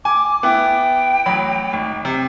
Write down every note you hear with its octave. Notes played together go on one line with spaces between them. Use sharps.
G#5 D6
B3 E4 G5
A1 F#3 B5
G#1
C3